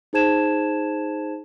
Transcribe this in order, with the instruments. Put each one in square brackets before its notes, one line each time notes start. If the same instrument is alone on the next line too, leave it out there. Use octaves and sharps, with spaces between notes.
[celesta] D#4 G#4 C5 A5 G#6 E7